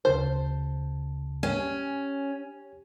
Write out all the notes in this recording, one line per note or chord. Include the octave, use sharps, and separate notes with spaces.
D2 C#3 C5 A5
C#4 G4 C#5 G#5